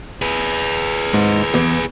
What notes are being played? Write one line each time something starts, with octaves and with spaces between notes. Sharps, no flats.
G#4 B4
G#2
E2